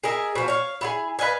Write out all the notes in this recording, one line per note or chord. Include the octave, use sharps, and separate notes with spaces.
G#4 A#4 D#5 E5
B2 F3
C#5 F5
E4 F4 G#4
B4 D#5 F5 G#5